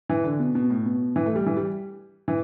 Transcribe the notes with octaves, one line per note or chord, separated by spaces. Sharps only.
E3
D3
B2
B2
A2
B2
E3
A3
G3
E3
G3
E3